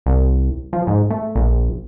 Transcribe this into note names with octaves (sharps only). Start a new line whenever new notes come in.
C2
F3
G#2
A3
A#1